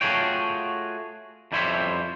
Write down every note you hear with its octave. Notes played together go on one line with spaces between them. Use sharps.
A3 F4 F#4 G#4 C#5 G5
F2 G3 E4 C5 C#5 E5